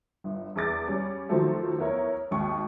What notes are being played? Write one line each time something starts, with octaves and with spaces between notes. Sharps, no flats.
G1
E2 G#4 D6 A6
G3 C#4
D#3 F3 F#3 A3
B3 E4 A#4 C#5
G#1 D#2 C#6